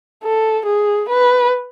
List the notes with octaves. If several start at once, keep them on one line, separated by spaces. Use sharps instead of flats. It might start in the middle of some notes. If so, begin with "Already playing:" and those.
A4
G#4
B4